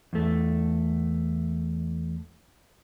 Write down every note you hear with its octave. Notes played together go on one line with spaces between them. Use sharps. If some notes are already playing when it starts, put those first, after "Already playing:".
E2 A3